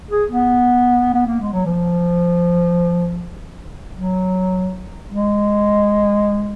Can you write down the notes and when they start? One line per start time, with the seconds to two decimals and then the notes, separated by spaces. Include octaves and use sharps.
0.11 G#4
0.30 B3
1.14 B3
1.27 A#3
1.40 G#3
1.52 F#3
1.65 F3
3.96 F#3
5.12 G#3